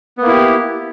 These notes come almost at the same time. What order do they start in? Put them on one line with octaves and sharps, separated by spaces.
B3 A#3 E4 G4